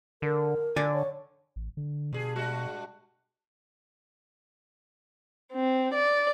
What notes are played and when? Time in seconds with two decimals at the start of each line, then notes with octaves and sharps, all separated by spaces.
0.22 D3 A#4
0.76 D3 D5 G#5
0.94 C#5
1.56 A1
1.77 D3
2.13 G2 B2 G#4
2.36 G2 G#3 F#4
5.52 C4
5.93 D5